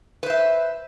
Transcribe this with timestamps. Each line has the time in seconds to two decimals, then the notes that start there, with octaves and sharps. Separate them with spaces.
0.23 B4
0.26 C5
0.30 E5